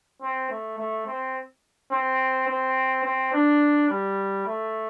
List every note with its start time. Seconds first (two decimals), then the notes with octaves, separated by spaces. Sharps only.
0.22 C4
0.50 A3
0.78 A3
1.07 C4
1.91 C4
2.48 C4
3.04 C4
3.33 D4
3.90 G3
4.46 A3